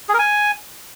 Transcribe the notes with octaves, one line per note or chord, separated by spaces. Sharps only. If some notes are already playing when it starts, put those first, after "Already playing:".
G#4
A#4
G#5